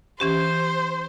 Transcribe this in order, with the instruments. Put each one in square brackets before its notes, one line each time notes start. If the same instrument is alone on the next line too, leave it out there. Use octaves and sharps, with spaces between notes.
[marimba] E3 C#4 G4 [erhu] C5